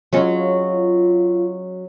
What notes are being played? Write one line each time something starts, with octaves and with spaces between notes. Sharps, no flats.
F#3 G#3 C#4 F4